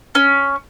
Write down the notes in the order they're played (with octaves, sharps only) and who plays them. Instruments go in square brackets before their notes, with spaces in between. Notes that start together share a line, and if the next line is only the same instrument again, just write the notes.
[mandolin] C#4